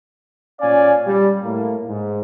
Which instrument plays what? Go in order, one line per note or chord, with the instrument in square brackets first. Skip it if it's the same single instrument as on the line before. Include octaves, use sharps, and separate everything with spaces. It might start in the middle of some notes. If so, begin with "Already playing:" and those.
[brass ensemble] A#2 C#4 D5 F5 G#5
G3
A2 A#3
G#2